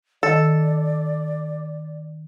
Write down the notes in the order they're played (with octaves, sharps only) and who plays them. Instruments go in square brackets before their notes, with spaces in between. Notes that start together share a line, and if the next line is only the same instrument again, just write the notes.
[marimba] D#3 D#5 [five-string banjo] A4 [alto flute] D5